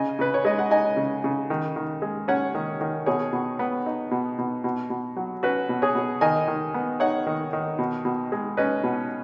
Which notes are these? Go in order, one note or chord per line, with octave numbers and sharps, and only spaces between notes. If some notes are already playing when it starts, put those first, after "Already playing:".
Already playing: C#3 D#5 G#5
C#3 B4
C#5
G#3 D#5
F#5
D#4 D#5 G#5
C#3
C#3
D#3
D#3
G#3
C#4 C#5 F#5
D#3
D#3
B2 G#4 C#5
B2
B3
D#4
B2
B2
B2
B2
F#3
C#4 F#4 B4
B2
G#4 C#5
B2
D#3 D#5 G#5
D#3
B3
D#4 C#5 F#5
D#3
D#3
B2
B2
G#3
C#4 B4 D#5
B2